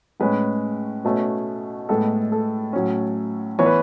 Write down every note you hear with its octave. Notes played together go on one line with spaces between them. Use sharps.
A2 G#3 C#4 B4
B2 A3 C#4
A2 G#3 B3 A4
A4
A2 F#3 C#4
E3 B3 C#5
B4